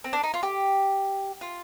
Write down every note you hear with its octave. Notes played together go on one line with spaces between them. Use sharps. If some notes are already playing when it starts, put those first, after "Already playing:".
C4
D4
D#4
F4
G4
F4